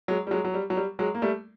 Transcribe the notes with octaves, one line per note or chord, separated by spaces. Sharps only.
F#3 G#3
G3
F#3 G#3
F#3
G3
F#3
G3
F#3 G#3
A#3
G3 A3